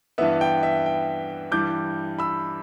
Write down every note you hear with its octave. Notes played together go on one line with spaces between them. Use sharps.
G2 E3 B3 E5
G5
E5
G5
G2 E3 G3 D6 G6
B5 E6